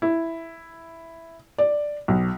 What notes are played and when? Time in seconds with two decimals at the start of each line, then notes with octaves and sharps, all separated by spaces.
0.02 E4
1.58 D5
2.08 B1